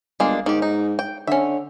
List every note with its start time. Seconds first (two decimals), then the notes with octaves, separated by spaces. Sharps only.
0.20 G1 G#3 A#3 D4
0.46 G#2 D#3 G4
0.62 D#4
0.99 G5
1.27 D3 C#4 E5